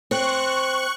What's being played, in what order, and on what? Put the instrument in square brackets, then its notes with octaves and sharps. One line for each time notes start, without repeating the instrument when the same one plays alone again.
[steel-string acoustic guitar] C4 [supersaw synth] C#6 F#6